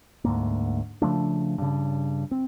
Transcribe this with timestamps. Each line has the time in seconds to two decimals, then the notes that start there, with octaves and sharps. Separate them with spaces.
0.24 D2 G#2 A#3
1.02 C#3 F3 A3 D4
1.58 G2 C#3
2.31 C4